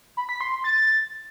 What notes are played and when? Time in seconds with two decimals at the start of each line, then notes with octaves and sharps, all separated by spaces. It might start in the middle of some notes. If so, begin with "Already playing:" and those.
0.17 B5
0.29 B6
0.41 C6
0.52 C6
0.64 A6